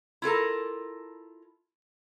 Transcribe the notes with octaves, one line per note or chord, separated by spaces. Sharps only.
E4 F4 A4 A#4